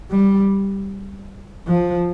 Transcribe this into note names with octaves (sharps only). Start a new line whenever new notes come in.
G3
F3